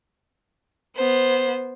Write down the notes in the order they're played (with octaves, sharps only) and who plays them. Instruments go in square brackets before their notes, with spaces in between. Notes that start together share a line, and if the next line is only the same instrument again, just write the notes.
[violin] B3 C5